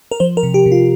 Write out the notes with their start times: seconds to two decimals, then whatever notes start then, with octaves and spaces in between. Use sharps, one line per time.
0.11 A#4
0.20 F3 C5
0.37 A#4
0.43 C3
0.54 G4
0.66 C3
0.72 F4